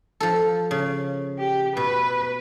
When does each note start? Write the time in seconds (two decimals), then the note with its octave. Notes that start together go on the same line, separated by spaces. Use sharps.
0.20 F3 A4
0.71 C#3
1.39 G4
1.77 B2 B4